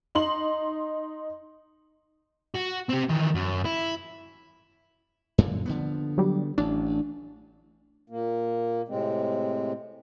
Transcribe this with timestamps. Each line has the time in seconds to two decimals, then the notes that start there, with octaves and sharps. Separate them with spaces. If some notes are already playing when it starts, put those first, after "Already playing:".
0.15 D#4 C6 F#7
2.56 F#4
2.90 C4 G4
3.10 D#3 E3
3.35 F#2
3.65 E4
5.38 F#2 A#2 D3
5.66 D3 F3 B3
6.18 F#3 G3
6.58 A1 D4
8.10 A#2 A#3
8.88 A2 C3 G#3 C4